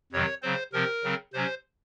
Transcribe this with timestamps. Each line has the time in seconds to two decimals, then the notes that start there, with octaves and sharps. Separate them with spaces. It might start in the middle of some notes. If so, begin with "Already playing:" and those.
0.12 F2 C3 D#3 F#3 C#5
0.42 C#3 F#3 C4 C5
0.73 C3 F3 C4 A#4
1.03 C#3 F#3 C4
1.33 C3 F#3 C#4 C5